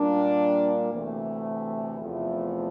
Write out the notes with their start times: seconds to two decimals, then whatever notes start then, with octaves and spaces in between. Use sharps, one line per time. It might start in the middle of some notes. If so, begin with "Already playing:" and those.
Already playing: A#2 G3 A#3 D4
0.92 D2 C3 E3 A3
2.00 E2 C3 F3 A3